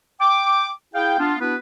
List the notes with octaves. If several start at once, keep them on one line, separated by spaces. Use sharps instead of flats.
G5 D6
E4 G#4 F5 G5
B3 D4 F4
B3 D4 E4 F#4 B4